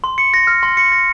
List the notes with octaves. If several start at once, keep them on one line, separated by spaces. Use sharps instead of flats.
C6
C#7
A#6
F6
C6
C#7
A#6